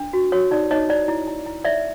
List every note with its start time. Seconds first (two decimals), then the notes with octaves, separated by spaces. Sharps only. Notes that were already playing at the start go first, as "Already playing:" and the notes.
Already playing: D4
0.13 F#4
0.32 F#4 C#5
0.51 D#4 D5
0.71 D#4 C#5 D#5
0.89 E4 D5
1.08 E4
1.28 E4
1.46 E4
1.65 C#5 D5 E5